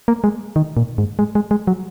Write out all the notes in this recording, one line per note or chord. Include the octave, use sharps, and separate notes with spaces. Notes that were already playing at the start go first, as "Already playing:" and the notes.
A#3
G#3
D#3
A#2
G#2
G#3
G#3
G#3
F#3